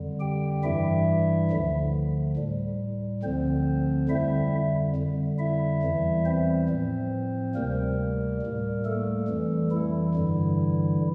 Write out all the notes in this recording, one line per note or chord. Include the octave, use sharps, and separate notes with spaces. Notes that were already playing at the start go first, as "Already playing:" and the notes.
Already playing: F2 D3 G3
G4 G5
G2 E3 G3 E4 E5
D2 D3 F3
A2 G3
D2 D3 F3 C4 C5
F2 D3 G3 E4 E5
F2 D3 G3
E4 E5
E2 E3 G3
C4 C5
A2 F3
D2 C3 G3 A#3 A#4
A2 G3
A3 A4
F2 E3 G3
E3 E4
G2 D3 G3